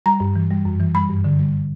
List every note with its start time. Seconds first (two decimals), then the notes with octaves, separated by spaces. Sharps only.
0.06 G3 A#5
0.20 G2
0.36 E3
0.50 G3
0.65 F#2
0.80 E3
0.95 G3 B5
1.09 G2
1.24 D3
1.39 G3